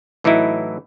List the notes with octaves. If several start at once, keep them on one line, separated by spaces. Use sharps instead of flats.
A2 E3 F#3 D#4 E4